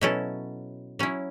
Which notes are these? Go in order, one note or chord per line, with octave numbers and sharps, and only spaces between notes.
B2 F#3 C#4 E4 A4
F#3 C#4 E4